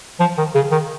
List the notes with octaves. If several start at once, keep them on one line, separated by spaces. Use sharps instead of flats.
F3
D#3
C#3
D#3